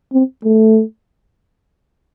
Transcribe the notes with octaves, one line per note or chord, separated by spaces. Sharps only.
C4
A3